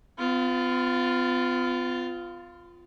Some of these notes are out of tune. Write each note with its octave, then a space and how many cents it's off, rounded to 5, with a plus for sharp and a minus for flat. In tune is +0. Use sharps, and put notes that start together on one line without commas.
B3 +45 F4 +0